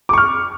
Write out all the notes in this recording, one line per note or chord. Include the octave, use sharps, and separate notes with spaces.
C#6 D6 F6